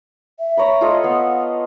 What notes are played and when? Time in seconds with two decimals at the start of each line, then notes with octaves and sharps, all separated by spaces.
0.39 E5
0.57 C#5 A#5 B5
0.81 F4 A4 D#5
1.04 B3 F5 F#5